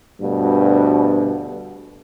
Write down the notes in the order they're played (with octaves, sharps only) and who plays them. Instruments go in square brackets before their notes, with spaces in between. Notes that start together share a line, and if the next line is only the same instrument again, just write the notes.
[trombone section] D2 G2 B2